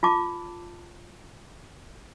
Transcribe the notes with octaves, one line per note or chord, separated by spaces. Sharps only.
F4 A5 D6